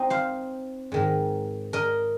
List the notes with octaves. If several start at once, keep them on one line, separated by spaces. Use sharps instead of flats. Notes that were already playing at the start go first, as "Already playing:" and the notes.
Already playing: C4 D#4
C5 F5
G#2 D#3 G#3
A#4 D#5